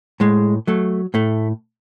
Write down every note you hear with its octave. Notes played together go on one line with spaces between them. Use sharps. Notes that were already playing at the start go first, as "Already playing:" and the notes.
A2 G#3
F#3 A3
A2 A3